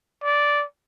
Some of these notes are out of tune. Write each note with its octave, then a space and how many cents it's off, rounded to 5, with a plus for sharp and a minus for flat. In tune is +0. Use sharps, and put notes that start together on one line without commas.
D5 -10